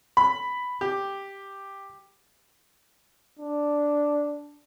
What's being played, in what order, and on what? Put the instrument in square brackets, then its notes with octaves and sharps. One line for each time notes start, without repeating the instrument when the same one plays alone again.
[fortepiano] B5
G4
[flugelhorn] D4